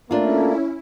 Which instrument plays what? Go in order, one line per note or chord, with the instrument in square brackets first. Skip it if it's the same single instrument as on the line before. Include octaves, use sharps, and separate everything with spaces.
[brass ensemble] A3 A#3 [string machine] C#4 E4 [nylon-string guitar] D4 F4